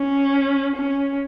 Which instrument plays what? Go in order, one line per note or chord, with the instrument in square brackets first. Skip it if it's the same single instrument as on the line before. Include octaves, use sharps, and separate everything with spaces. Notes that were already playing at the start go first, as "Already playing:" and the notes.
Already playing: [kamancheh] C#4
C#4